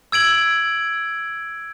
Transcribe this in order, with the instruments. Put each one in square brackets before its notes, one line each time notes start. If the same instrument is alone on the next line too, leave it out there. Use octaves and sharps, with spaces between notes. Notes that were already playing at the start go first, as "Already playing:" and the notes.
[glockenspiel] E6 G#6 D7 F#7